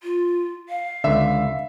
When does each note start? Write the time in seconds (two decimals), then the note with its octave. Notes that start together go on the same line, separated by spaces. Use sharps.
0.03 F4
0.69 F5
1.04 C#2 D3 E5